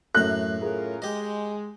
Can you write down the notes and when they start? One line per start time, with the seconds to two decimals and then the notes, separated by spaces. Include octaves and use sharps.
0.15 F#2 A2 A3 A#5 F#6
0.61 C#4 F4 G#4 A#4
1.02 G#3 G4 D#5